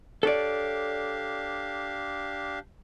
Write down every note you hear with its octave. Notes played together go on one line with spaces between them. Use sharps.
D4 G4 A4 C#5 D5 F5